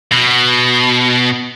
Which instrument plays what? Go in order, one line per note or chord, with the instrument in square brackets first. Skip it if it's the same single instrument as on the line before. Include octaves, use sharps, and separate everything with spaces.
[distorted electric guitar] B2